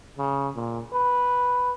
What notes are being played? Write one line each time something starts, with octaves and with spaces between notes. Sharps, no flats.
C#3
A#2
B4